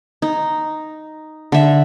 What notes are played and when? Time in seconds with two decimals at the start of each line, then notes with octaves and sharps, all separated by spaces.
0.22 D#4
1.52 D3 E5